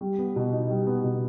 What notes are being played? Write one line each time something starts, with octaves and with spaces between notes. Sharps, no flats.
G3
B3
B2
D#4
G3
B3
B2